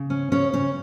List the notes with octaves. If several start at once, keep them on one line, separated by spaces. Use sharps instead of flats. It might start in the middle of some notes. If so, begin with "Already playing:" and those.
Already playing: C#3
C#4
C#3 C#4 C#5
C#3 C#4 C#5